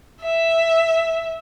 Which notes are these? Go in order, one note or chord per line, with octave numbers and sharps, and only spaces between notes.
E5